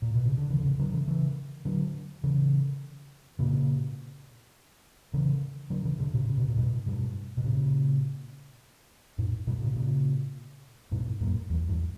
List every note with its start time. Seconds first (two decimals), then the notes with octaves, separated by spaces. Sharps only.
0.02 A#2
0.14 B2
0.25 C#3
0.37 D3
0.50 C#3 E3
0.60 D3
0.64 C#3 E3
0.79 D3 F#3
0.93 C#3 E3
1.08 C#3 E3
1.65 D3 F#3
2.23 C#3 E3
3.39 A#2 C#3
5.14 C#3 E3
5.70 D3 F#3
5.85 C#3 E3
5.99 B2 D3
6.14 A#2 C#3
6.29 C#3
6.38 B2
6.48 A#2
6.57 G2 B2
6.86 G2 B2
7.37 B2
7.44 A#2 C#3
9.18 F#2 A#2
9.47 G2 B2
9.61 A#2 C#3
9.76 A#2 C#3
10.91 G2 B2
11.21 F#2 A#2
11.50 E2 G2
11.69 E2 G2